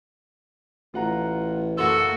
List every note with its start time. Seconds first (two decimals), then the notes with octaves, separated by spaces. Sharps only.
0.94 A1 F4 F#5 A#5
1.77 F#1 A#3 F#4 A4